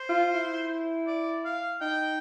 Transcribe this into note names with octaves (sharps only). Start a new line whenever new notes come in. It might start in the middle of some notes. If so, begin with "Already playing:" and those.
Already playing: C5
F4
E4
D5
F5
D#4 G5